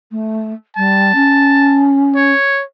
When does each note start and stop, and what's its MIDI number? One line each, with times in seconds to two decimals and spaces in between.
0.11 0.52 57
0.77 1.12 55
0.77 1.93 81
1.14 2.32 61
2.16 2.63 73